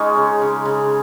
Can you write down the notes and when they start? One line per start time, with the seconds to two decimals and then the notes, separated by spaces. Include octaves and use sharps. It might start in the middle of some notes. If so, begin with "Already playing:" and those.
Already playing: G#3 C#4 D#4 F4
0.16 C#3
0.42 C#3
0.65 C#3